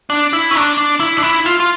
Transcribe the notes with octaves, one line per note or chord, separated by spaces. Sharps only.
D4
E4
C#4
D4
D4
E4
D4
E4
F4
F4